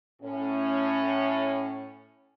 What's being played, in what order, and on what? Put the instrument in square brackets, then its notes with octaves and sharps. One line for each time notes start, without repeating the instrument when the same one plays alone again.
[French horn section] A2 C#4